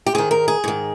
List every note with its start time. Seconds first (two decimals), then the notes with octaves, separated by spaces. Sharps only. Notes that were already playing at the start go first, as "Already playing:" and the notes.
0.06 G4
0.15 G#2 D#3 G#4
0.31 A#4
0.48 G#4
0.64 G#2 D#3